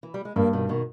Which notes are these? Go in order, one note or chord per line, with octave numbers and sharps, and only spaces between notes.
E3
G3
G#3
G2 G3 A#3
B2 D#3
B2 D#3